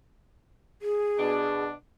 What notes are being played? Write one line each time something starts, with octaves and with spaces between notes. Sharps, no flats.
G#4
B2 D4